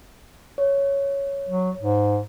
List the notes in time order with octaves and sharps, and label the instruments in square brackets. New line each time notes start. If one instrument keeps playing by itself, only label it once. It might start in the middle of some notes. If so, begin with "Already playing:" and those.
[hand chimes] C#5
[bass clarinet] F#3
G#2